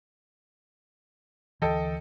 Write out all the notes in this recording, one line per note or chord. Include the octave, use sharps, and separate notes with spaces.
D2 E3 A4 D#5 G5